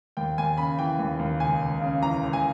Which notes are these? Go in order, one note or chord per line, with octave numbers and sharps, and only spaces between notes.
D#2 G5
D#2 G#5
C#3 B5
E3 G5
D#2
D#2
C#2 G#5
C#2
C#3
E3 A#5
C#2
G#5